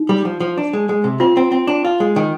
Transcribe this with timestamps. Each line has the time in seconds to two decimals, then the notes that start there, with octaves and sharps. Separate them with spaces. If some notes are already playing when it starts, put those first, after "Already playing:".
Already playing: D#4
0.09 G3
0.25 F3
0.40 F3
0.58 D4
0.73 G#3
0.89 G#3
1.04 C3
1.20 C4 F4
1.37 C4
1.52 C4
1.67 D4
1.85 F4
2.00 G#3
2.16 D#3